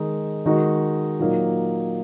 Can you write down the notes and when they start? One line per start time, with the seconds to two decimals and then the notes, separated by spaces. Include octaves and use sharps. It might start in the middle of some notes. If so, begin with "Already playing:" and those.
Already playing: D#3 G#3 D#4
0.46 D#3 G#3 D#4 F#4
1.19 A#2 F#3 A#3 D#4